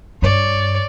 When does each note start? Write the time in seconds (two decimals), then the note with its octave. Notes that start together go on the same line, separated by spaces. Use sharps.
0.22 G2 C#5 D5